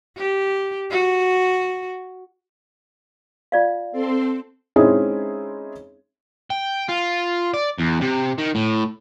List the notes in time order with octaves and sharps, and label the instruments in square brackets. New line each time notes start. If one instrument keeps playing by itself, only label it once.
[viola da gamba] G4
F#4
[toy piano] F4 D5 F5
[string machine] C4 A4 C6
[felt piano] G#3 C4 C#4 D#4 E4 G#4
[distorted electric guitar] G5
F4
D5
E2
C3
D#3
A2